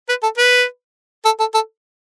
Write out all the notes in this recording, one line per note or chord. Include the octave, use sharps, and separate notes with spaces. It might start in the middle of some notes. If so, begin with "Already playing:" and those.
B4
A4
B4
A4
A4
A4